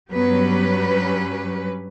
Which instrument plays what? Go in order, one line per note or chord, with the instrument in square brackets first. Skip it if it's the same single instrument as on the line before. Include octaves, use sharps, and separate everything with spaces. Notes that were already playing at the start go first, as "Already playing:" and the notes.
[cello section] G2 F#3 C#4 G4 B4 [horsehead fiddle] B3